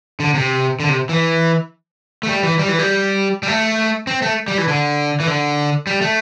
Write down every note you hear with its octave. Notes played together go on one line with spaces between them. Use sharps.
D3
C3
D3
C3
E3
A3
G3
E3
G3
E3
G3
G3
A3
C4
A3
G3
E3
D3
E3
D3
G3
A3